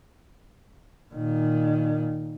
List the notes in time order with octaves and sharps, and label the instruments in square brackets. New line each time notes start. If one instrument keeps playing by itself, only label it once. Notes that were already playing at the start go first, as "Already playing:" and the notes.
[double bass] A#2 D#3